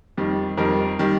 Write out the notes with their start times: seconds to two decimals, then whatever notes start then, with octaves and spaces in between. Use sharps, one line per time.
0.17 F2 D#3 G3
0.57 F2 D#3 G3 A#4
0.99 D#3 G3